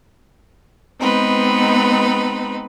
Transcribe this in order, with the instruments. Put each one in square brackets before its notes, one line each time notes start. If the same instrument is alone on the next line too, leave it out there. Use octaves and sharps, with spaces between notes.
[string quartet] G#3 B3 C4 D#4 B4